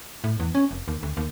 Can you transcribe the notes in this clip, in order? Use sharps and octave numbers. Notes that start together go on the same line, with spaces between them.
A2
E2
C#4
F1
D#2
D2
D#2